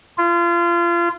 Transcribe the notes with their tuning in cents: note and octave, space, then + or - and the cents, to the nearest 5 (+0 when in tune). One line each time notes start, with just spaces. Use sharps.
F4 -30